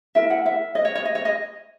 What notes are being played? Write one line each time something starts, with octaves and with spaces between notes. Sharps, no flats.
E4 A#4 E5
F#5
E5
D#5
C#5
C#5
D#5
C#5
D#5